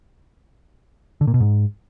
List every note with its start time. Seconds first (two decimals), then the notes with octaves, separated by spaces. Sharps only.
1.21 D3
1.27 A#2
1.34 B2
1.40 G#2